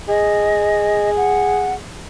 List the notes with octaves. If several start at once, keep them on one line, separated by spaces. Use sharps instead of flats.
G#4 D#5
F#5